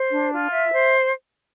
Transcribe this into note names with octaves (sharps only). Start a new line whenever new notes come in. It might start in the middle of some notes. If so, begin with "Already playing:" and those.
Already playing: C5
D4
F4
E5
C5